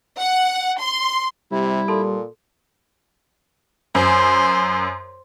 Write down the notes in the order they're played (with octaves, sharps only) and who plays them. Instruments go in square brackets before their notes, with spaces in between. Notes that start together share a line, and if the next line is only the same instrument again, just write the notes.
[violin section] F#5
C6
[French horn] C3 [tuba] G3 [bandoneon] E4
[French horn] A#2 [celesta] A4 A5 C6
[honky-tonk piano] F#2 [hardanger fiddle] C5